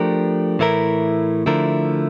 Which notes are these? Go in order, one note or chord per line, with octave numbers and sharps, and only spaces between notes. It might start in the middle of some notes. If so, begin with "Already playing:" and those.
Already playing: F3 A3 D4 G4 A#4
A2 E3 A3 E4 A#4
D3 F3 A3 E4 A#4